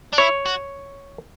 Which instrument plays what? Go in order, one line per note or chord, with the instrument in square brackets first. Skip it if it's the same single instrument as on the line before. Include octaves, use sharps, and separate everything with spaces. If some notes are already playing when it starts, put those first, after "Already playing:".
[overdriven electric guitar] D4
[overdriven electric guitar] E4 [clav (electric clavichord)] C#5
[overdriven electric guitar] F#4